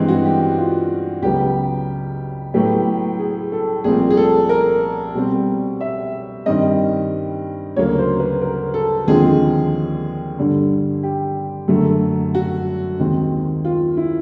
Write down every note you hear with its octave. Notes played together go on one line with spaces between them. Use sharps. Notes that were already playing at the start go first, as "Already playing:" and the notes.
Already playing: G2 E3 G#3 C4
F#4
G4
G4
F4
C#2 C#3 F#3 B3 G4
A2 F#3 B3 G4
G#4
A4
C2 A#2 F3 A3 C4 G#4
G#4
A4
A#4
B2 G3 C4
E5
G2 D#3 G3 C4 D#5
D2 C#3 F#3 A#3 C#5
C5
B4
A#4
A4
D#2 D3 F3 G#3 C4 G#4
G2 D3 G3
G4
F#2 D3 F#3 A3
F#4
D#2 D#3 G#3 C4
F4
E4